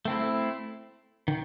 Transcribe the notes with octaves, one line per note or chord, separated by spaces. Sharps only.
A3 C4 E4
D#3